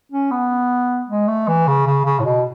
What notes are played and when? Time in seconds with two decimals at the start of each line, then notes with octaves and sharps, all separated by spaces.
0.12 C#4
0.31 B3
1.09 G#3
1.28 A3
1.48 E3
1.68 C#3
1.87 C#3
2.05 C#3
2.20 A2
2.25 B2